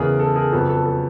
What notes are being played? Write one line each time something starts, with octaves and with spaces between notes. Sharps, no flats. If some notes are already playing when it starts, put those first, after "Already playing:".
Already playing: E2 C#3 E3 G#4 A#4
A4
G#4 A#4
F2 C#3 F#3 B3 A4
A4
A4